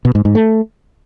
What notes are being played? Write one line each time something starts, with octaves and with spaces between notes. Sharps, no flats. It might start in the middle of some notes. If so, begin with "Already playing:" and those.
B2
G#2
G#2
A3